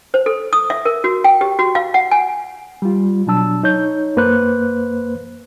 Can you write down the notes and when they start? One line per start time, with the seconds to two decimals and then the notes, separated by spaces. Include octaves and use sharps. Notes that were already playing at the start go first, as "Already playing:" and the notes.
0.14 C5
0.26 A4
0.53 D#6
0.70 E5
0.85 A#4
1.04 F#4
1.24 G5
1.41 G4
1.59 F#4
1.75 F5
1.94 F#5
2.11 G#5
2.82 G3 F4
3.27 B2 F#3 D4 A5 E6
3.63 D#4 C#5 G6
4.16 F#2 A#3 B4 C5 F#6